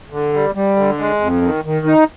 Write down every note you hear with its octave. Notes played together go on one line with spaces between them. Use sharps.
D3
G3
G3
D3
G#3
F2
D#3
D#3
D#4